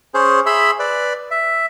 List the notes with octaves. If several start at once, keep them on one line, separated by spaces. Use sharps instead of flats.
C#4 G#4 C5
G#4 E5 B5 C6 E6
B4 D5
E5